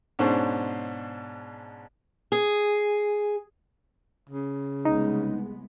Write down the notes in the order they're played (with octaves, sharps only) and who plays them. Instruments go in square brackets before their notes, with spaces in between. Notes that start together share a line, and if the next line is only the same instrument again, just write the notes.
[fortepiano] G#2 B2 C#4 D4 C5
[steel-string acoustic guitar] G#4
[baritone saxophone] C#3
[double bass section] C2 G#3 B3 [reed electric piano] D#4